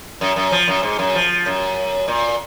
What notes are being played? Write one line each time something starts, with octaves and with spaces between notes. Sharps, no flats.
F#2
F#2
F3
F#2
G#2
F#2
F3
F#2
A#2